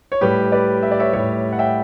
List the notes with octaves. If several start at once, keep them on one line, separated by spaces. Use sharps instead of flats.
C#5
A2 G3 G4 B4
B4 D5
E5
D5
C#5 E5
A2 G3 C#5 E5
F#5
E5 G5